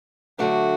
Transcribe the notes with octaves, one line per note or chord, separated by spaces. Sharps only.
D3 F#3 A3 D4 F#4